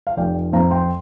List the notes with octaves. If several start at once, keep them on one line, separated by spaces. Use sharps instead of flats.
F5
F1 D5 G5
F2 F3 C4 F5 A#5
G5 C6